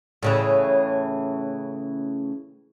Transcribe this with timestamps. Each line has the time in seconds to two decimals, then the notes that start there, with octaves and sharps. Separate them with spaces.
0.23 A2 C#3 E3